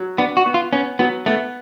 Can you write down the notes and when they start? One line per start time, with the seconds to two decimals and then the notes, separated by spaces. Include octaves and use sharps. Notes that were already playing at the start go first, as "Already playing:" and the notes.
Already playing: F#3
0.18 B3 D4
0.37 F#4
0.46 B3
0.54 F4
0.73 B3 C#4
0.99 F#3 B3
1.26 A3 B3